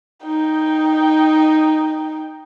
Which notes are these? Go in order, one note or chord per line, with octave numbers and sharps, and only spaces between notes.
D#4 G5